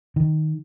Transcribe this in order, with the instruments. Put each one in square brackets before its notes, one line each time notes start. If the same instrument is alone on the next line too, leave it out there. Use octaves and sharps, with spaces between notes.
[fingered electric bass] D#3